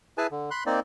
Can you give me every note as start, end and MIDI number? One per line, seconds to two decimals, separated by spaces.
0.18 0.27 64
0.18 0.27 68
0.18 0.27 71
0.18 0.27 80
0.18 0.27 81
0.31 0.50 50
0.51 0.64 83
0.51 0.64 84
0.51 0.64 90
0.66 0.80 58
0.66 0.80 60
0.66 0.80 63
0.66 0.80 74